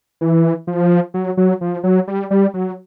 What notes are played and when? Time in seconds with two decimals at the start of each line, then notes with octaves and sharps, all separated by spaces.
0.21 E3
0.67 F3
1.14 F#3
1.37 F#3
1.61 F3
1.83 F#3
2.08 G3
2.31 G3
2.54 F#3